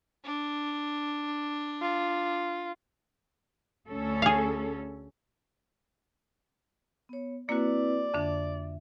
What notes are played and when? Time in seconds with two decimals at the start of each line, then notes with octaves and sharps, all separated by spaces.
0.25 D4
1.81 F4
3.88 D2 C#4 A4
4.22 G#4 F5
7.09 B3 C#5
7.49 A#3 C4 E4 F#4 B4 D5
8.14 F2 D3 D4 E5